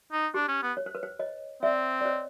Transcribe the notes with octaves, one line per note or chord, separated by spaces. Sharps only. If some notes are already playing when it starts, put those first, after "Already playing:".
D#4
D4 G4
C#4
B3
C#5
C5
B4
C5
C#5 D#5
C4 D5 E5
D5
C#5 D#5